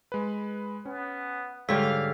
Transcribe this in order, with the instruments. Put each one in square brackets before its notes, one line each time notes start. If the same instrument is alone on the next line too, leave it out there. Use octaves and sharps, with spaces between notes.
[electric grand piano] G#3 B4
[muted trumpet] B3 [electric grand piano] C#4
[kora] G#2 D3 G3 [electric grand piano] C#5 [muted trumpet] F5 [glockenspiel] E6 B6